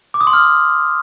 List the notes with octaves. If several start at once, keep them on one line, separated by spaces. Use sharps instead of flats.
D6
D#6
C6
F6